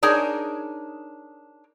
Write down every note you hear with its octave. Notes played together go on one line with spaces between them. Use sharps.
D4 D#4 G#4 A#4 C#5 G#5